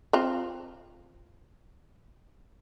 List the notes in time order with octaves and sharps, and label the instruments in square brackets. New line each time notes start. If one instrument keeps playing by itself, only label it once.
[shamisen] C4 F4